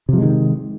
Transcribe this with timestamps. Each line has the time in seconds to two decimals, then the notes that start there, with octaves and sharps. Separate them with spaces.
0.09 C3
0.13 F3
0.18 G#3
0.22 D#3